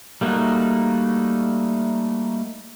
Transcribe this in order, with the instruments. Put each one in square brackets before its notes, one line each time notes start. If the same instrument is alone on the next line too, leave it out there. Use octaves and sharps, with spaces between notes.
[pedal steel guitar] G3 A3 A#3 D#4 F#4